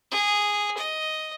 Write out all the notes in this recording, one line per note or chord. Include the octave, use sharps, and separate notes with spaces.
G#4
D#5